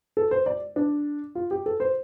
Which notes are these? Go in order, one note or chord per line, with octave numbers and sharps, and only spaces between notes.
A4
C5
D5
D4
F4
G4
A4
C5